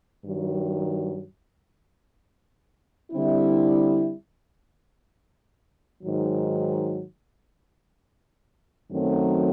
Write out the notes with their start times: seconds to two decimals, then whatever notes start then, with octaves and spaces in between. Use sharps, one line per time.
0.23 G2 D#3 F#3
3.12 D3 G3 C4 E4
6.01 G#2 D#3 F#3
8.90 F#2 D#3 F#3 A3 C4